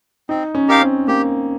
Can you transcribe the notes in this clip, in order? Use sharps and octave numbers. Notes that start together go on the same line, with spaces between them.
C4 D#4
C#4
D#4 G4 A#4 F5
C4
A#3 G4